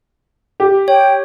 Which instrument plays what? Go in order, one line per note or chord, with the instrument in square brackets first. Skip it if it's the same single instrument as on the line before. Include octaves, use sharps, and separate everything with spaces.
[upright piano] G4
[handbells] C#5 [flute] G5